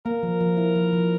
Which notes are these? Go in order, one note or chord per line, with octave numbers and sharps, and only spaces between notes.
A#3 A#4
F3
F3
E4
F3
F3